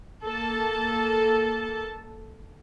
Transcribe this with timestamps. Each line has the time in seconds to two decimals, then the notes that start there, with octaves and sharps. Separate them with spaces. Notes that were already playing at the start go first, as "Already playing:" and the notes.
0.24 A#3 A4 A5